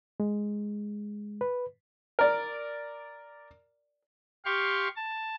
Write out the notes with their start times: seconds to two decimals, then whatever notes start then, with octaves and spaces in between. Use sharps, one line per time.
0.20 G#3
1.41 B4
2.19 A#4 D5
4.45 G4 F5 C6 C#6
4.96 A5